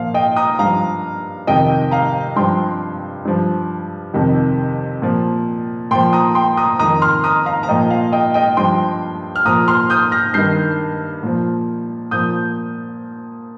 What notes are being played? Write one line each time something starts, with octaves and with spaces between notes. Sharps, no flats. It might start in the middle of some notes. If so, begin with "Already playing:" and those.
Already playing: A#2 F3 F5
D#5 G5
A#5 D#6
G2 F3 F5 A#5
F2 C3 D#3 D#5 G5
F5 A#5
G2 F3 G5 C6
G2 F3
F2 C3 D#3
A#2 F3
A#2 F3 G5 C6
A#5 D#6
G5 C6
A#5 D#6
F2 D#3 A#5 D#6
C6 F6
A#5 D#6
F5 A#5
A#5
A#2 F3 D#5 G5
F5
D#5 G5
D#5 G5
G2 F3 G5 C6
F6
A#2 F3 A#5 D#6
C6 F6
D#6 G6
F6 A#6
G2 D#3 G6 C7
A#2 F3
A#2 F3 D#6 G6